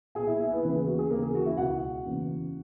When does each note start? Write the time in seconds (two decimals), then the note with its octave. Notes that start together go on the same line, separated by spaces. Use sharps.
0.15 B1 A#2 G#4 G#5
0.27 E4 E5
0.40 E4 E5
0.51 B3 B4
0.63 D#2 C#3 E3 B3 B4
0.76 G#4
0.86 F#4
0.99 G#4
1.10 D#2 C#3 E3 A#3 A#4
1.23 G#4
1.35 F#4
1.46 E4 E5
1.57 C#2 B2 F#4 F#5
2.06 F#1 E2 C#3 E3